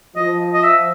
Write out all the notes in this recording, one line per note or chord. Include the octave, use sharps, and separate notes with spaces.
F3 D#5
D#5
E5